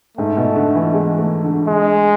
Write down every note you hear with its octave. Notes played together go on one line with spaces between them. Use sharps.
G#2 A3
B2
D3
E3
G#3
A3
D3
D3 G#3